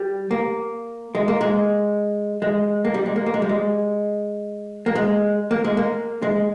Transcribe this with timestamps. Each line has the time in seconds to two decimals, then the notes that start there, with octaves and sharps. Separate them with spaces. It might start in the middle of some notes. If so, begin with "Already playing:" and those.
Already playing: G3
0.31 A#3
1.15 G#3
1.28 A#3
1.41 G#3
2.42 G#3
2.85 A#3
2.94 G3
3.06 G#3
3.16 A#3
3.26 A#3
3.34 G#3
3.42 G3
3.49 G#3
4.86 A#3
4.95 G#3
5.51 A#3
5.64 G#3
5.77 A#3
6.22 G#3